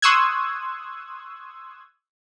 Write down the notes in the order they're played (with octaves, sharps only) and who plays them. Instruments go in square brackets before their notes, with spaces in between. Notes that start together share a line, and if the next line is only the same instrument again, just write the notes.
[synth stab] C6 C#6 D#6 E6 F#6 G#6